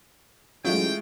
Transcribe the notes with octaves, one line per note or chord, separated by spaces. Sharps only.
A1 F#3 G#3 A3 F4 G5